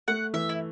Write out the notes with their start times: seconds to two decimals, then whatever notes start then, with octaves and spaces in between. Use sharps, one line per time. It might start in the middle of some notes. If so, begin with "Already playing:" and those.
0.08 A3 F#5
0.33 E3 E5
0.49 E4